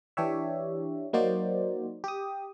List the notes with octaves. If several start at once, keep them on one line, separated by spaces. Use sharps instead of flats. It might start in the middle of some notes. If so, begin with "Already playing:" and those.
E3 D4 G4 C#5 E5
F#3 A#3 D#4 F#4 C5 D5
G4 D#6